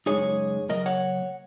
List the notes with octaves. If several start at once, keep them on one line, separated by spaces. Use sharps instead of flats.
F#2 C#3 G#3 D#4 G#4 C#5
C#3 F#3 A#3 A#4 D#5
C#5 F#5